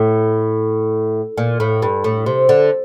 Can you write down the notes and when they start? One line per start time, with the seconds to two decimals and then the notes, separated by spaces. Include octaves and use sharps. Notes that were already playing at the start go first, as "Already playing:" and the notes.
Already playing: A2
1.38 A#2
1.60 A2
1.82 G2
2.04 A2
2.26 C3
2.49 D3